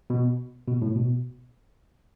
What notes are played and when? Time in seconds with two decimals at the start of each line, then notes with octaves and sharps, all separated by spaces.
0.10 B2
0.68 B2
0.82 A2
0.96 B2